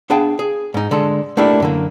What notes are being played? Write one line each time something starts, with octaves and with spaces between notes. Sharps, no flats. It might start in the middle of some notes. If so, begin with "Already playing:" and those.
B3 D4 G#4 F5 G5 A5
G#4
G#2 D#4
D3 G#3 A4
A3 A#3 D4 E4 G4
F#2 D3 A#3